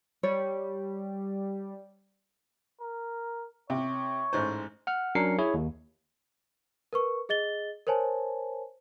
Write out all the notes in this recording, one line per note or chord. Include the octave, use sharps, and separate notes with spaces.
G3 C#5
A#4
C3 C#5
A1 G#2 C5
F#5 F6
F#3 C#4 D4 A#4 C7 C#7
E4 G#4 C#5
D#2
A#4 B4 C#6
G#4 D#5 A6 G7
A#4 C5 C#5 G#5 A5